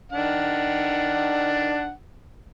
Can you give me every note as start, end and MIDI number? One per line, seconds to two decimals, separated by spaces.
0.12 1.91 51
0.12 1.91 62
0.12 1.91 78